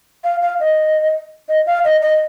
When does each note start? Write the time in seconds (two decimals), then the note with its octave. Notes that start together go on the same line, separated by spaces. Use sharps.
0.24 F5
0.42 F5
0.60 D#5
1.49 D#5
1.67 F5
1.85 D#5
2.02 D#5